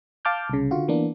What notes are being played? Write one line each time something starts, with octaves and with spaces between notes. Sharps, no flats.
F5 A5 D6 F6 G6
C2 C#3
D3 F4 F#4
E3 A#3 B3 D4